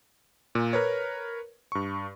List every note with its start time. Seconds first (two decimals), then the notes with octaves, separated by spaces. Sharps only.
0.55 A#2
0.73 A#4 B4 C#5
1.72 G2 C#6